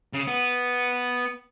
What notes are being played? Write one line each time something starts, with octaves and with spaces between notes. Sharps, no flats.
C#3
B3